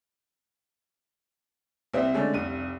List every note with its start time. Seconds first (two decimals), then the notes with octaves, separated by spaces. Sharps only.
1.93 C2 C4 E5
2.14 D3 G#3 A3 C#4 D4
2.33 F1 C2 D#7